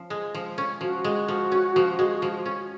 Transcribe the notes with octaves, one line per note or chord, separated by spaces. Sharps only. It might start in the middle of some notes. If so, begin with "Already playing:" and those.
Already playing: F3 C#4
G#3
F3
C#4
F3 F#4
G#3
F3
C#4
F3
G#3
F3
C#4